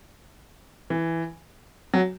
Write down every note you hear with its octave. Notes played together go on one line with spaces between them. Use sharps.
E3
F#3